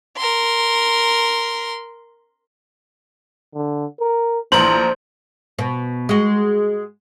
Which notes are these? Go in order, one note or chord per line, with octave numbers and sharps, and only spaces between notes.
A#4 C6
D3
A#4
A#1 E3 C5 A#5 F#7
B2
G#3 F#4